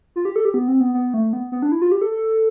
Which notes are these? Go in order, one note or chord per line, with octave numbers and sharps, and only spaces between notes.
F4
G4
A4
G4
B3
C4
B3
B3
A3
B3
B3
D4
E4
F4
G4
A4
A4